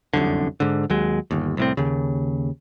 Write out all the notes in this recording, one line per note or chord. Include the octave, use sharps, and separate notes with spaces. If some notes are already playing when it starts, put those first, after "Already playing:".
F1 C2 F#2 D3
G#2 D3
D#2 F#3 G#3
G1 D#2
C2 A2 C4
D#2 C#3